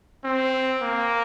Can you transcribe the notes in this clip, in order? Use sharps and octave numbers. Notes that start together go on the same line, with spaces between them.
C4
A#3